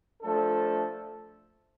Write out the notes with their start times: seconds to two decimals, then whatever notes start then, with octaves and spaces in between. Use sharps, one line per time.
0.23 F3 A3 D4 A4